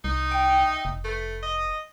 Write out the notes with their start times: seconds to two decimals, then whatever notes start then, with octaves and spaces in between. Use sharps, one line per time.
0.04 C2 D#4
0.29 E5 G5 D6
0.85 F1
1.05 A3 B4
1.43 D#5